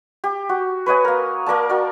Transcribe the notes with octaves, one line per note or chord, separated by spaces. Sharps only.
G4
F#4
B4 C#5 D#5 G#5
A#3 A#4
A#3 A#4 D5 A5
F#4 D5